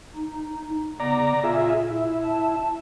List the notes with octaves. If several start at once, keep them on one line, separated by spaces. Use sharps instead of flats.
D#4
C#3 B3 D5 A#5
A#2 F4 G#4 E5
E4
A5